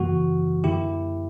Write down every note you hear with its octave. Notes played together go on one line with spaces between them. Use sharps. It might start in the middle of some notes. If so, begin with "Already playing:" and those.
Already playing: F#2 C#3 E3 G3 A#3 F#4
F#2 D3 A#3 E4 G4